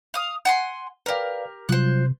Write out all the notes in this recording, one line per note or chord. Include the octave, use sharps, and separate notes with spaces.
F5 D#6
F#5 G#5 C6
G4 A#4 B4 D5 F5
C3 F#3 G3 F4 C5 F#6